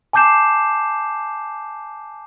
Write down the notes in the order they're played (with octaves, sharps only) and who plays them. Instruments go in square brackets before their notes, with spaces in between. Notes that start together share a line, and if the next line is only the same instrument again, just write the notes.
[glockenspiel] G#5 A5 D6 G6 C7 E7